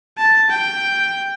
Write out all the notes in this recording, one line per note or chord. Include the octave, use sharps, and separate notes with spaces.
A5
G5